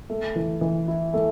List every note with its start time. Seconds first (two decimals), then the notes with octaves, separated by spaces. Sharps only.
0.10 A3
0.36 E3
0.61 E3
0.88 E4
1.14 A3